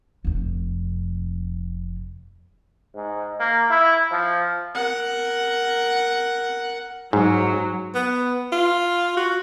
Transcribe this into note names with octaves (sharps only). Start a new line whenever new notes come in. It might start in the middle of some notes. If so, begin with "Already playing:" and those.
F1 F2
G#2
A#3
E4
F3
A#4 F#5
G#2 F#3
B3
F4
F#4